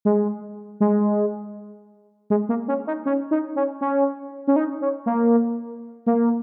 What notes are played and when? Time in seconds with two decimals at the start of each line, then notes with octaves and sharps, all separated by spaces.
0.05 G#3
0.80 G#3
2.30 G#3
2.49 A#3
2.68 C#4
2.87 D#4
3.06 C#4
3.31 D#4
3.56 C#4
3.81 C#4
4.48 C#4
4.56 D#4
4.81 C#4
5.06 A#3
6.07 A#3